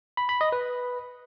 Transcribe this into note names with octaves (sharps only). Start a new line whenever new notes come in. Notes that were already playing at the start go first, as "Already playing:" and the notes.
B5
B5
D#5
B4